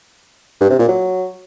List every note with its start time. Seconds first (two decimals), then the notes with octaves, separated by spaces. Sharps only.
0.61 G2
0.70 C3
0.79 A#2
0.89 F#3